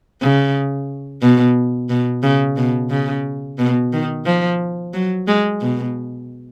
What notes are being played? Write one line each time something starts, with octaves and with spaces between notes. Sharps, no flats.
C#3
B2
B2
C#3
B2
C#3
B2
D#3
F3
F#3
G#3
B2